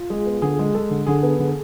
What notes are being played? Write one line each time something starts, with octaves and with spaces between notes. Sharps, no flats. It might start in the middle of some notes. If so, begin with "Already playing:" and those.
Already playing: F4
G#3 G#4
B3
D3 G#4
G#3
G#3 A4
D3
D3 G#4
B3
D3